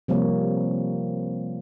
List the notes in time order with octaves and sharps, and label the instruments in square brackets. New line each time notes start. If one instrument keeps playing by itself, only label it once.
[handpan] C3 F3 G3 A#3 C#5